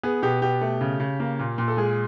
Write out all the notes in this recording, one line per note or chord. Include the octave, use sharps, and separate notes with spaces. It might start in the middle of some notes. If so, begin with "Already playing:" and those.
B3 G#4
B2 G4
B2 G4
A3
C#3
C#3
A#3
A#2
A#2
A4
G#3 G#4